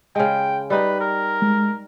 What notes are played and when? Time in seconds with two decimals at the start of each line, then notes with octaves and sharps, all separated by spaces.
0.15 C#3 G#3 G5
0.70 G3 D#4 B4
1.01 A#4
1.42 G#3